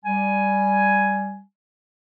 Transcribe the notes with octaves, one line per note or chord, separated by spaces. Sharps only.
G3 G#5